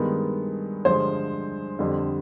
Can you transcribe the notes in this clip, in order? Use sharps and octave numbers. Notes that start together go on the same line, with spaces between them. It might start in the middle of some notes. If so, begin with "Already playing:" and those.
Already playing: G2 D#3 G#3 B3
G2 D3 F3 G#3 C5
F2 D3 G3